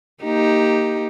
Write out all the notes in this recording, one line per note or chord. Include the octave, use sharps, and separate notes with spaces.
A#3 D#4 G4